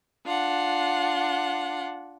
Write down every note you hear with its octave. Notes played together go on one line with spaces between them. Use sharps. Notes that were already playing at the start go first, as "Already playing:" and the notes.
D4 F4 F#5